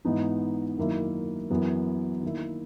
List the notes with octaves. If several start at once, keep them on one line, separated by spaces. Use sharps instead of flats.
G#2 E3 B3 D#4
F#2 D#3 A#3 E4
F#2 E3 B3
D#3 A#3 E4